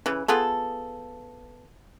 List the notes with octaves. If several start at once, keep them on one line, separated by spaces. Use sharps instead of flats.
C#3 E3
B3 F4 G#4 A4